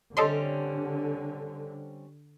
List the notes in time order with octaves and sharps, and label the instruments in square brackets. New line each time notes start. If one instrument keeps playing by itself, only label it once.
[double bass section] D3 [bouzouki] G3 C4 C#4 [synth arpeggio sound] A4 D#5 C6